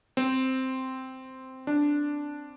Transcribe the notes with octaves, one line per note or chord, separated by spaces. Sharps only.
C4
D4